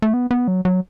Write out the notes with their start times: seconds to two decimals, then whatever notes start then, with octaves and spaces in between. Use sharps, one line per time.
0.02 A3
0.14 B3
0.31 B3
0.48 F#3
0.65 F#3